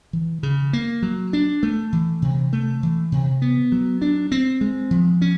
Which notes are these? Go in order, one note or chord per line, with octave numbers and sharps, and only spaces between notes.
E3
C#3
A#3
F#3
D4
A3
E3
C3
A3
E3
C3
B3
F#3
D4
C4
G#3
F3
C#4